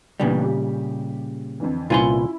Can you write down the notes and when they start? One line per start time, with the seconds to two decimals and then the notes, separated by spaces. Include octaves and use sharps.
0.20 A#2 C#3 E3 G3 B3 D4
0.43 G4
1.60 F2 D3 E3
1.90 C2 A#2 C#4 E4 F4 B4 G#5 C6